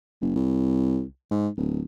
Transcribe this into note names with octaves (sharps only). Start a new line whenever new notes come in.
F#1
C2
G#2
D1